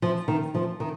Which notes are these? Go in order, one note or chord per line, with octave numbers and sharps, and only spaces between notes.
F3
D#3
F3
D#3